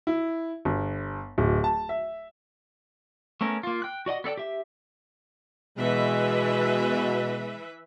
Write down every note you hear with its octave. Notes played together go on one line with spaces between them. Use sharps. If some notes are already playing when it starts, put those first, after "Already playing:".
E4
G1
D1
A5
E5
A3 B3 C#4 A#4
A#3 F4
G5 F#6
F#4 D5 D#5 F#5
B3 A4 D5 G5
G4 E5
B2 E3 G#3 B4 E5